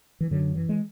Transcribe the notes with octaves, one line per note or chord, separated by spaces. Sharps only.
E3
F#2 D3 F#3
E3
G#3